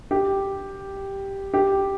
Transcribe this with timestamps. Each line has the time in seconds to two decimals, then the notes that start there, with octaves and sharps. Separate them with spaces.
0.11 G4
1.54 G4